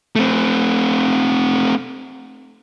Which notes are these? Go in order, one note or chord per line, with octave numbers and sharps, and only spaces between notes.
A3 C4